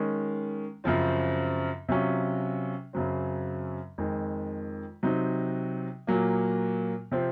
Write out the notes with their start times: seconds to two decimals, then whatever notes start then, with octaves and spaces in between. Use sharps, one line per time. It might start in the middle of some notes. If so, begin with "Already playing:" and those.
Already playing: D#3 G#3 C#4
0.84 F#2 C#3 F3 C4
1.89 C3 F#3 C#4 F4
2.93 F#2 C#3 F#3 C4
3.98 F2 D#3 G#3
5.03 C3 F#3 C4 D#4
6.07 A#2 F#3 A#3
7.12 C3 F3 C4